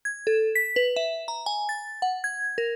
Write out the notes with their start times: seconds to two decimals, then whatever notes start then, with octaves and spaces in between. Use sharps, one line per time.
0.05 G#6
0.27 A4
0.55 B6
0.76 B4
0.96 E5
1.28 A#5
1.46 G#5
1.69 A6
2.02 F#5
2.24 G#6
2.58 A#4